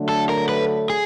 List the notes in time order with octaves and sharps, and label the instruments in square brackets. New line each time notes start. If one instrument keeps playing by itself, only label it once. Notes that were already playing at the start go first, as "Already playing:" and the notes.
Already playing: [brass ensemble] D3 F#3 A3
[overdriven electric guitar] A4
A#4
B4
G#4